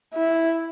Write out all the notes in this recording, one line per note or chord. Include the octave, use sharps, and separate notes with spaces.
E4